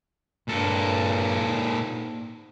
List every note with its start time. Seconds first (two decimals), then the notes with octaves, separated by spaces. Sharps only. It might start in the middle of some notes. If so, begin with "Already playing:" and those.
0.48 G2 A#2 A4
1.40 G#2